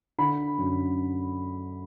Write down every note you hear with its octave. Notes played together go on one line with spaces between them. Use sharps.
D3 B5
F#2